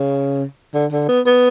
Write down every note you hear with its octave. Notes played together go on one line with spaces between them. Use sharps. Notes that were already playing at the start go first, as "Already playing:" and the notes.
Already playing: C#3
D3
D3
B3
B3